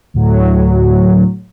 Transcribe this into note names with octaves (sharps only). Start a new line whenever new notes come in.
D2 A2 F#3